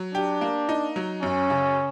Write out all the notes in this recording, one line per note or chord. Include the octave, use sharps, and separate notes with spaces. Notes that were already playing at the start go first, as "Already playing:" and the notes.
Already playing: F#3
D4 G4
A#3
D#4
F#3
F#2 C#4
C#3